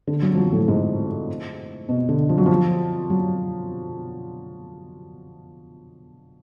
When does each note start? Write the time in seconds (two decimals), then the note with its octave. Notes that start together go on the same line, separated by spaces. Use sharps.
0.07 D3
0.22 F#3
0.33 F3
0.37 F#3
0.53 A2
0.68 G#2
1.89 B2
2.09 D3
2.29 F3
2.38 F#3
2.46 F3
3.10 F#3